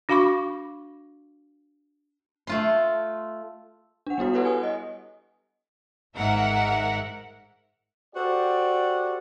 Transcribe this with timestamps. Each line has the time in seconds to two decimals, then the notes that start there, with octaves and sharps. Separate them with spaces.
0.09 D4 F#4 F5 B5 C#6 D6
2.47 A3 F4 C6
4.07 D4 F#5
4.18 G3 B3 E4 F#4
4.33 G4 A4 B4 C#5 F#5
4.45 G#5 D#6
4.63 D#5
6.14 G#1 G#2 A#4 E5 F#5
8.15 F#4 G4 A4 C5 D5